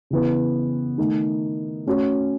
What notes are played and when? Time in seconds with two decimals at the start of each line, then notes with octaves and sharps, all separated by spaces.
0.10 C#3 E3 B3
0.98 D#3 A3 D#4
1.86 A3 C#4 F#4 C#5